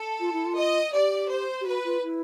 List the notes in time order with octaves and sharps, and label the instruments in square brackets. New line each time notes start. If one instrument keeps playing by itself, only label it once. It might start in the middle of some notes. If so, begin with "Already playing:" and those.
Already playing: [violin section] A4
[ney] F4
E4
F4
[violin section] D#5
[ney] G4 [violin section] D5
[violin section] C5
[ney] G4
[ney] F#4 [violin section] B4
[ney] F4
E4